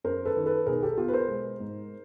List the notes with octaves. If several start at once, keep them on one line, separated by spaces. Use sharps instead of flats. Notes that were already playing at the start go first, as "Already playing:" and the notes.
F#2 A#4 C5
A4 B4
D#3
A4 B4
B1 G#4 A#4
G4 A4
B2 F4 G4
B4
A#4 C5
G#3
G#2